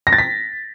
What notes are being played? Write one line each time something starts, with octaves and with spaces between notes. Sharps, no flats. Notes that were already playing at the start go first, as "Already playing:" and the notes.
A#6
A6
B6